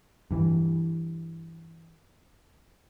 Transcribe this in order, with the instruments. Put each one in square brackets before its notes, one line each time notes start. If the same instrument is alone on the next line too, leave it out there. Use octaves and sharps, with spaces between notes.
[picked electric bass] G2 E3